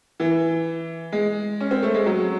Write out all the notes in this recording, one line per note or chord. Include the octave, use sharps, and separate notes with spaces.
E3
G#3
C#4
C4
A3
G#3
F#3